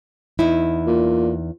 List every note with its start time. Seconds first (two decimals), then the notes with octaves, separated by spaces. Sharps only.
0.39 E2 D#4 E4
0.87 A#2